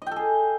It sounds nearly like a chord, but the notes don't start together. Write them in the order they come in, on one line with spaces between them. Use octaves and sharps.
D#5 G5 A4 G#4